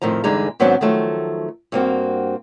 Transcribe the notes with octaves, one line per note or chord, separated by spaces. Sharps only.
F2 A2 D#3 F3 A#5
E2 G2 D3 G#3 D#4 A#5
G#2 D#3 F#3 B3 C4 D4
D#3 F3 F#3 A3
G2 A#3 C4 F#4